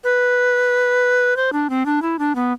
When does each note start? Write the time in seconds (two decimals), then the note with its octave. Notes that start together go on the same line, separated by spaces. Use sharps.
0.04 B4
1.36 C5
1.53 D4
1.70 C4
1.86 D4
2.02 E4
2.19 D4
2.35 B3